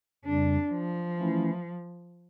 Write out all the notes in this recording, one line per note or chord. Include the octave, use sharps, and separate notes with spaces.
F2 C#3 G3 D4
F3
E3 A3 C#4 E4